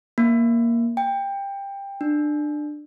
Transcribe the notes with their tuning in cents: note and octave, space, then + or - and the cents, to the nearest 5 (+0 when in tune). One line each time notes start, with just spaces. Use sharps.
A#3 +5
G5 +20
D4 +20